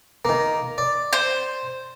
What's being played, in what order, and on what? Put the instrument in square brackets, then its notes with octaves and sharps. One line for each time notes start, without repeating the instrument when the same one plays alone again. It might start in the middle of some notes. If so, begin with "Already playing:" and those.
[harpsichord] D#3 A#3
D5
[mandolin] C5